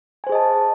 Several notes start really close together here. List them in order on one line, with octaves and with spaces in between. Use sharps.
G#5 C5 G#4 D#5 A5